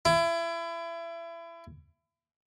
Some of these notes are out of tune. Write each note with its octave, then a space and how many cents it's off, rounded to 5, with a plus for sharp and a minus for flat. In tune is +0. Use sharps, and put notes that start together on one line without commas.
E4 +30